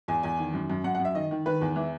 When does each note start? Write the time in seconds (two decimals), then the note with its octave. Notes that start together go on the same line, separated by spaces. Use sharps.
0.08 E2 G#5
0.23 E2 G#5
0.39 D#3
0.53 F#2
0.70 F#2
0.84 F#2 F#5
0.95 F#5
1.00 F#2
1.05 E5
1.15 D#3 D#5
1.31 D#3
1.46 D#3 B4
1.61 E2
1.76 E3